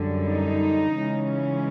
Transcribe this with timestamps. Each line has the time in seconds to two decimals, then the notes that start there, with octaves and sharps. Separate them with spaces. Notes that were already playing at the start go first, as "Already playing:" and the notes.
Already playing: F#2 D3 G3
0.26 D#4
0.94 C#3 E3 G#3 C#4